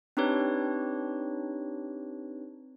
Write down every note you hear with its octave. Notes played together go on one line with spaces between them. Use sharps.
C4 D4 D#4 G4 B4 C#5